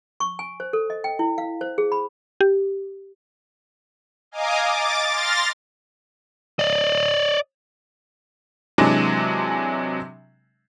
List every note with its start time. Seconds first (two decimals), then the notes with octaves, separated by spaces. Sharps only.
0.20 C#6
0.39 G#5
0.60 C5
0.73 A4
0.90 D#5
1.04 G5
1.19 E4
1.38 F5
1.61 C5
1.78 G#4
1.92 B5
2.41 G4
4.31 D#5 F5 G#5 A#5 D6 D#6
4.66 D6 A6
5.08 C6 F6 A6 A#6
6.59 D5 D#5
8.78 C3 E3 F#3 G#3 D4